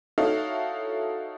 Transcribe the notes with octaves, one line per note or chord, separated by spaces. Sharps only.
D#4 E4 F#4 A4 C#5 F5